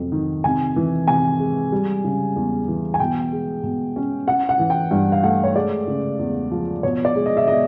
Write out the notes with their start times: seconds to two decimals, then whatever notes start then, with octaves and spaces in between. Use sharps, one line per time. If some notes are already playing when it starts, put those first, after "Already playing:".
Already playing: F2 C3 F#3
0.12 D#3
0.44 C3 G#5
0.76 E3
1.07 C3 G#5
1.39 G#3
1.72 G3
2.04 C#3
2.36 E2
2.68 E3
2.94 G#5
3.00 B2 G5
3.32 G#3
3.63 B2
3.96 C#4
4.28 C#4 F#5
4.49 F#5
4.59 E3
4.70 G5
4.91 G2
5.12 F5
5.23 A3 F#5
5.44 C#5
5.56 G#3 D5
5.88 C#3
6.19 E2
6.51 F3
6.83 B2 C#5
7.05 D5
7.16 G#3
7.26 D#5
7.37 E5
7.48 B2 D#5